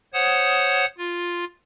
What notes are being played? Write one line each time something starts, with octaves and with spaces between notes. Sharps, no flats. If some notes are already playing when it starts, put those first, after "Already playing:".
C5 C#5 F#5 D#6
F4